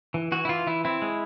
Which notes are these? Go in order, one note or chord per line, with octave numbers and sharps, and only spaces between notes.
E3
E3 F#4
E4
E3 F4
E3 E4
C4 E4
G#3